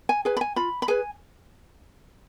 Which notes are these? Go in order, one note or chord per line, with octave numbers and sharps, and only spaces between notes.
G#5
G#4 B4 G#5
B5
G#5
F4 B5
B5
G#4 B4 G#5